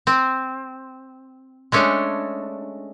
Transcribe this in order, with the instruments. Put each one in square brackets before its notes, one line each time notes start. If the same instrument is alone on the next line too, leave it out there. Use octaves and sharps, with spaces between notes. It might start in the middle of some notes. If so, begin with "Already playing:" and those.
[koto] C4
G#3 A3 C#4 D4